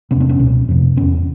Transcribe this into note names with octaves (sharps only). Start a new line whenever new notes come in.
E2 C3 B3 C#4
C4 D4
B3 C#4
C#2 B2
F2 C3
E2 B2 B3 C#4